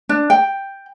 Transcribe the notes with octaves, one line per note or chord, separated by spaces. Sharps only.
D4
G5